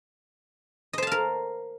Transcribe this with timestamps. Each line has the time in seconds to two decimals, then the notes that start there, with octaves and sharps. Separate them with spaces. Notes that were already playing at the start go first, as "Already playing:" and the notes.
0.93 D#5
0.98 C5
1.02 A5
1.07 F5
1.12 A#4